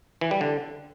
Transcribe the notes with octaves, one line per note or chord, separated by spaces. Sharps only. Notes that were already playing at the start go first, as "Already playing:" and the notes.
E3
G3
D3